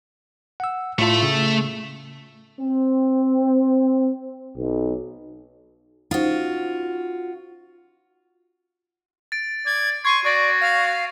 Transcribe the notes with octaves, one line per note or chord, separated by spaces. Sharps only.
F#5 E6
A2 A3 E4 F4 E5
C#3
C4
B1
C#4 D#4 F4 F#4 C5
A6 D7
D5 G#6
C6 C#6 G#6 C7 D#7
F#4 D5 C#6 A6
F5